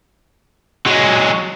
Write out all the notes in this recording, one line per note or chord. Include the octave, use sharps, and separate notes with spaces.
F#3 G#3